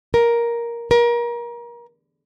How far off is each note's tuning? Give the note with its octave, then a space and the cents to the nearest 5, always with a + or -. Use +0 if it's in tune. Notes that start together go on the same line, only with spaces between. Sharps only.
A#4 +10
A#4 +30